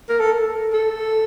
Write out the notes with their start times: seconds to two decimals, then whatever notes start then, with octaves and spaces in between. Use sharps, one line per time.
0.09 A#4
0.19 A4
0.73 A4